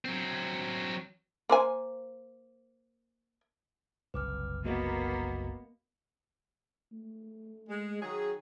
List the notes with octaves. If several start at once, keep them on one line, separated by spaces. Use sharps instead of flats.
F#3 C4
A#3 C5 G#5
F#1 C2 B4 D6 F6
A#3 B3 F#4 D#5 F5
A3
G#3
D#3 F#3 G#4